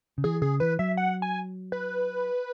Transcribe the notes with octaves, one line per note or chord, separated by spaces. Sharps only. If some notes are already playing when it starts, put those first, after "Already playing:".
C#3
E3 G#4
C#3 G#4
E3 B4
F#3 E5
F#5
G#5
B4